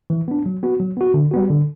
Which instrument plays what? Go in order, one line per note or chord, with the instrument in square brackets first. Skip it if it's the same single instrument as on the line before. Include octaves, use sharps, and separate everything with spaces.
[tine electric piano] E3
B3 D4
F#3
B3 F#4
F#3
B3 F#4
D3
G3 B3 F#4
D3